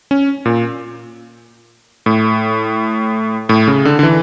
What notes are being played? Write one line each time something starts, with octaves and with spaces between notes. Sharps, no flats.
C#4
A#2
A2
A2
C#3
D3
D3
E3